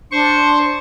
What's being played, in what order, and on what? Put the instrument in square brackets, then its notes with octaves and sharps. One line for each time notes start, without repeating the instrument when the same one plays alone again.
[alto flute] D4 [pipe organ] C5 C#6